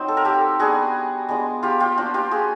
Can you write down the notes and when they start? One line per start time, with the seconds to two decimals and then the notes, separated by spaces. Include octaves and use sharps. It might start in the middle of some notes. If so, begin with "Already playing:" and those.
Already playing: F#3 C4 D#4 C5
0.08 A4
0.17 A#4
0.25 G4 A4
0.59 G3 B3 D4 F#4 G#4
1.29 G#3 B3 D4 F4
1.63 F4 G4
1.80 F4 G4
1.97 F3 A#3 D4 F#4
2.14 F4 G4
2.31 F#4 G#4